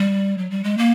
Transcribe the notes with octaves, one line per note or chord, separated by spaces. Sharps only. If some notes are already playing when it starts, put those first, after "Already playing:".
Already playing: G3
F#3
G3
G#3
A#3